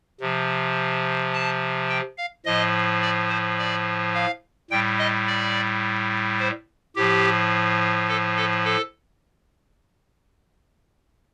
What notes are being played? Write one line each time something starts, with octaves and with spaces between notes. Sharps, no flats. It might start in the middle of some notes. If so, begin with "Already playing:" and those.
C3 F3
A5
G5
F5
A2 F3 D#5
D5
C5
D5
F5
A2 G3 G5
D#5
D5
C5
A2 F3 G4
A4
A4
A4